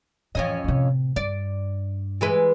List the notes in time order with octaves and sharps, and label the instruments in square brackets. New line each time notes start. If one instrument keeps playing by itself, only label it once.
[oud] F2 C#4 D#5 [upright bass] A2 E3
[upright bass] A2 C3
[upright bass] G2 [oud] D5
[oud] E3 G#3 B4